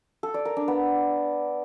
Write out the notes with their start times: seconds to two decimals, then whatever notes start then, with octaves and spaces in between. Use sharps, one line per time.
0.23 A4
0.34 D5
0.45 A#4
0.57 D4
0.68 B3